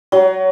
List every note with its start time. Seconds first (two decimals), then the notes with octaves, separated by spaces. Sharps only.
0.12 F#3